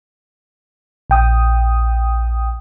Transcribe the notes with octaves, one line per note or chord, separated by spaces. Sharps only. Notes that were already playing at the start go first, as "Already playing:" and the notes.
A#1 G5 D#6